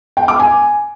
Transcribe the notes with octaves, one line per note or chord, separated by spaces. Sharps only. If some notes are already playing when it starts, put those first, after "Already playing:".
G5
D6
G#5